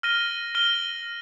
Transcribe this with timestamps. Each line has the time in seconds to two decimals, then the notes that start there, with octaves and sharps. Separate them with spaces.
0.03 F6 A#6 D#7 G7
0.55 F6 A#6 D#7 G7